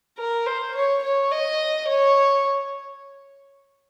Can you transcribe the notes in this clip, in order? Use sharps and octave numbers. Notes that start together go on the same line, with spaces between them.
A#4
C5
C#5
C#5
D#5
C#5